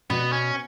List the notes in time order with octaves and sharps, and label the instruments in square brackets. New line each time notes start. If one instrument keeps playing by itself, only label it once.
[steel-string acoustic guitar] B2 [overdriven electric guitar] B3
[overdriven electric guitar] C#4